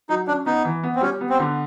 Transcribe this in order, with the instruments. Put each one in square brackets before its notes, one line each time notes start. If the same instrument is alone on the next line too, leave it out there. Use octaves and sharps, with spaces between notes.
[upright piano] F#3 [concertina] D#4
[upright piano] C#4 [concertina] D4
[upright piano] B3 [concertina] D#4
[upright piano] E3
B3
[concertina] C4
[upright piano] G3 [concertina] C#4
[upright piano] B3
[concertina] C4
[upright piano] D3